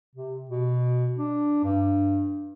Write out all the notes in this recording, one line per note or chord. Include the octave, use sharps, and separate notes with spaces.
C3
B2
D4
G2